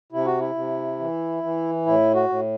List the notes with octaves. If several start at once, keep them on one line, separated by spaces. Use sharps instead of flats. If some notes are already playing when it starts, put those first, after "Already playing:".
C3 E4
F#4
E4
C3
E3
E3
A2 E4
F#4
A2